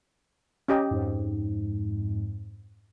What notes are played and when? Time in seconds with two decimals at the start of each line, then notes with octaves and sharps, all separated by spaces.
0.68 C#4 G4 D#5
0.91 F2 G#2